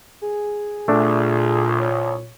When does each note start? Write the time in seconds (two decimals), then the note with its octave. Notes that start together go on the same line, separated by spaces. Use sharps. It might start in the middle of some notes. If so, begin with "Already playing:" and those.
0.22 G#4
0.88 C2 A#2 A3 D4
1.79 C#5